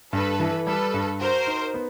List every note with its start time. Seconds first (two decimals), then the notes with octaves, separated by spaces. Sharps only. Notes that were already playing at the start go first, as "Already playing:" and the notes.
0.13 G2 A4 B4
0.40 E3
0.67 G3 A4 B4
0.94 G2
1.20 F#4 A#4 C5
1.47 D#4
1.74 B3